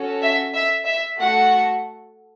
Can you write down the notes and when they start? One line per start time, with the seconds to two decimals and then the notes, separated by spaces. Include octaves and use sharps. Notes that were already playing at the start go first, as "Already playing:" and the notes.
Already playing: C#4 F#4 A4
0.22 E5
0.54 E5
0.86 E5
1.17 A3 F#4 A4 F#5